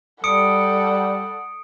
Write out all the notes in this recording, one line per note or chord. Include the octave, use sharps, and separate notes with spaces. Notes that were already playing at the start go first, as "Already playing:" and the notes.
G3 A4 F#5 D#6 C#7 D7